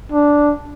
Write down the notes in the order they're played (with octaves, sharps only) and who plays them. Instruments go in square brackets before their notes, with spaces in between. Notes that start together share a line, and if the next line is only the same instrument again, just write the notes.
[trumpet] D4